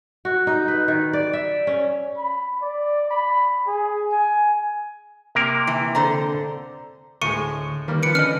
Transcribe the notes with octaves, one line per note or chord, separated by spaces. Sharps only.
F#4
D#4
B4
D#3
D5
E5
C#4
B5
D5
B5
G#4
G#5
C3 A#3 A#4
E3
D3 C5 A#5
D2 A2 G#3 C#6 C#7 D#7
D#3 G3 A#3
F3 B4 C#7 D7
D3 C#4 D4 B4 D#5 F6 C#7